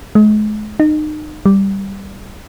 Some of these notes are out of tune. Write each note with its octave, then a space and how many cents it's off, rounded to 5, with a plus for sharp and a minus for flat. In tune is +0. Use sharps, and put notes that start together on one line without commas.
G#3 +40
D#4 -30
G3 +0